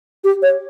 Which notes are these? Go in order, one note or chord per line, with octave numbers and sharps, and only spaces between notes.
G4
C#5